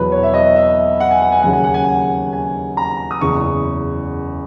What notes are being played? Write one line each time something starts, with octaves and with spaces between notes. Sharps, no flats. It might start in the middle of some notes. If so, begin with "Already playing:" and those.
Already playing: E2 B2 F#3 B4
C#5
E5
D#5
E5
F#5
G#5
F#5
G#5
D#2 C#3 F#3 F#5
G#5
F#5
G#5
F#5
G#5
A#5
D#6
F#1 E2 C#3 C#6